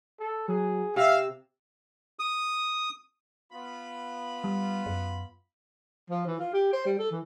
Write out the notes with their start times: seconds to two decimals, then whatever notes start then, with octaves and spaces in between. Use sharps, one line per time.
0.19 A4
0.48 F#3 G#4
0.96 C3 E5 F5 E6
2.19 D#6
3.52 B3 F4 B5
4.44 G3
4.86 F#2
6.10 F3
6.26 E3
6.39 F4
6.53 G4
6.73 C5
6.85 G3
6.99 A4
7.11 E3